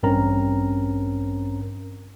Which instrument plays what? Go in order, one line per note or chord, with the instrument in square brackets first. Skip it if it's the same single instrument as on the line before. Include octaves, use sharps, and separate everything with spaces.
[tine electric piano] A1 G2 C4 C#4 A#4 A#5